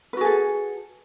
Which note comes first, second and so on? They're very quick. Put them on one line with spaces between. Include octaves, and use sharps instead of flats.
B4 F#4 G#4 A4